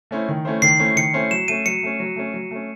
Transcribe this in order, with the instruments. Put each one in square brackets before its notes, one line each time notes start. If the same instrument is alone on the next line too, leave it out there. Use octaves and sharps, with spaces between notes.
[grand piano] A3 C#4 E4 C5
D#3
A3 C#4 E4 C5
[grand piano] D#3 [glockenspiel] C7
[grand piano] A3 C#4 E4 C5
[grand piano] D#3 [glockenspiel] C#7
[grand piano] A3 C#4 E4 C5
[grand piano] F#3 [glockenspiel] E7
[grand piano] A3 C#4 [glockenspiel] D#7
[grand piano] F#3 [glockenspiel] C#7
[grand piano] A3 C#4
F#3
A3 C#4
F#3
A3 C#4